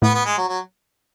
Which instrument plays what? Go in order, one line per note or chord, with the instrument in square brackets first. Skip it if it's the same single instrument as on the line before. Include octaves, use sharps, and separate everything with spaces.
[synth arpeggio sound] A2 A3 [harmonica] B3
[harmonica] B3
G#3
F#3
F#3